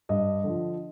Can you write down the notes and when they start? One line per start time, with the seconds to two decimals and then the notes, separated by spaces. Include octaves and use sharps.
0.09 G2 D#5
0.44 D3 F3